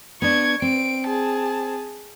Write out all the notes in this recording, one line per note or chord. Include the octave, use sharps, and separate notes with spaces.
B3 D4 C#6 G#6
C4 D7
G#4 A5